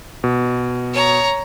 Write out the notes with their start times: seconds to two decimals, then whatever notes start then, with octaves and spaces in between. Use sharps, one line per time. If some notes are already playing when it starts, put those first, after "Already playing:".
0.24 B2
0.93 C#5 A#5